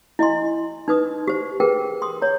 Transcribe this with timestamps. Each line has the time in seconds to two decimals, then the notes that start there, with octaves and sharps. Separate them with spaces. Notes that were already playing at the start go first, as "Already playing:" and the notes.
0.19 E4 D#5 G#5 C6
0.88 D#4 B4 D#6
1.28 G4 C5
1.60 G#4 A#4 B4 G5
2.02 C6 D#6
2.22 C#5 A#5